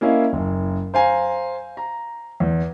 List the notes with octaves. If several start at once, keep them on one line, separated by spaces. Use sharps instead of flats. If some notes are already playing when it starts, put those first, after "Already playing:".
A#3 C#4 E4 D#5 F5
F#1
C5 F5 G#5 A#5
A#5
E2